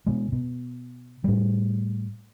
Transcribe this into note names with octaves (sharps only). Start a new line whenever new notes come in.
B2 G#3
B2
A2 G3